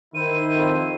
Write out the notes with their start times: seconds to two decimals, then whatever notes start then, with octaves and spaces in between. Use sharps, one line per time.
0.15 D#3 E4 C5 D#7
0.55 F2